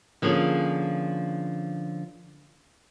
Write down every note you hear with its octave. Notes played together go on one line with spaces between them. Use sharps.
D3 F3 A#3 C#4 G#4